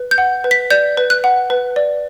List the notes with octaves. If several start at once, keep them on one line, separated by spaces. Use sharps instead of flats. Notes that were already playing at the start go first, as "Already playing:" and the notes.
Already playing: B4
G6
F#5
B4
B6
D5 G6
B4
F#6
F#5
B4
D5